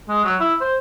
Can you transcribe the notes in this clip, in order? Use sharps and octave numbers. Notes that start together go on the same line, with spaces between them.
G#3
F#3
E4
C5